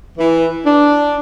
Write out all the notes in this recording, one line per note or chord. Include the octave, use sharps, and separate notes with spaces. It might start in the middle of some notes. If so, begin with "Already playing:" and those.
E3
D4